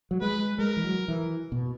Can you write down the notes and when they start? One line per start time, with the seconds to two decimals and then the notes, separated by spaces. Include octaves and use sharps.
0.11 F#3
0.21 G#3 B4
0.59 G#3 A#4
0.77 E3
0.84 F#3
1.08 E3
1.52 B2